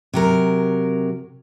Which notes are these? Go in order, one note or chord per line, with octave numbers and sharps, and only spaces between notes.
C3 F#3 A#4